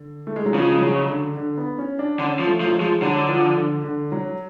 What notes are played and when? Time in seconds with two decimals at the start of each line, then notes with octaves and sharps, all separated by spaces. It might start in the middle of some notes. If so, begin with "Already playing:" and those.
Already playing: D3
0.27 A3
0.36 G#3
0.46 F#3
0.54 C#3 F3
0.75 G#3
0.82 F#3
1.09 D3
1.37 D3
1.57 B3
1.78 C#4
1.99 D4
2.19 D3 C#4
2.39 F3
2.47 A3
2.61 F3
2.65 F#3
2.74 G#3
2.81 F3
3.02 D3 F#3
3.29 F3
3.57 D3
3.84 D3
4.12 F#3